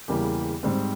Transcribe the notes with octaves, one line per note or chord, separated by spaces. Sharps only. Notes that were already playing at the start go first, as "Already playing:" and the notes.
E2 C#3 E3 G3 A#3 G4
G#2 G3 C4